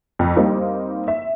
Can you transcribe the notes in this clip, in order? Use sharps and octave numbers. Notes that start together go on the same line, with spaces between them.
F2
G3 A#3 C4 D#4
E5